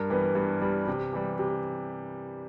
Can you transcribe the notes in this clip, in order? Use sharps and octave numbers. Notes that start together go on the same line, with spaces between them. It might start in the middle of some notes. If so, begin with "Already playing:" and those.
Already playing: G2 A#4
E3 G3 B3
G2
E3 G3 B3
C3
E3 G3
C3